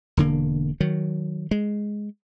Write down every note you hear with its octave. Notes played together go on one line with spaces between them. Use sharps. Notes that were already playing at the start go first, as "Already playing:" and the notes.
E1 D3 A#3
D#3 F#3
G#3